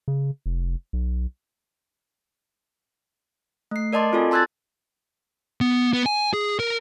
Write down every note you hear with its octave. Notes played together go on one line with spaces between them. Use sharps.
C#3
F1
B1
A3 C7
A#4 D5 D#5 A5 C6 D6
C4 F4 F#4 A4 D5 G#5
A5 C6 E6 F#6 G#6 A6
B3
B3
G#5
G#4
A#4